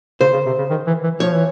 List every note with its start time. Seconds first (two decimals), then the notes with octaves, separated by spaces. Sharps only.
0.21 C#3 C5
0.33 C#3
0.46 C3
0.58 C#3
0.70 D#3
0.87 E3
1.04 E3
1.20 F3 C#5
1.33 E3